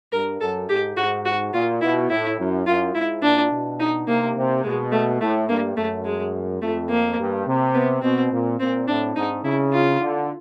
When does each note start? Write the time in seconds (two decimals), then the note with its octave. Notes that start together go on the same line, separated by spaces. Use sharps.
0.12 G2 A#4
0.41 F#2 A4
0.69 G#2 G4
0.97 G#2 F#4
1.25 F#4
1.53 A#2 F4
1.81 B2 E4
2.10 A2 E4
2.39 F#2
2.67 F#2 F4
2.95 G#2 E4
3.23 A#2 D4
3.51 B2
3.80 D#4
4.08 C3 A#3
4.36 C3
4.64 B2 G#3
4.92 A3
5.21 A2 A3
5.48 G2 A#3
5.77 F#2 A3
6.05 G#3
6.62 F2 A3
6.89 A#3
7.19 G2
7.47 C3
7.74 B3
8.02 B2 C4
8.31 A#2
8.59 A#2 C4
8.88 A2 D4
9.16 G#2 D#4
9.43 C#3 E4
9.72 F4
10.00 D3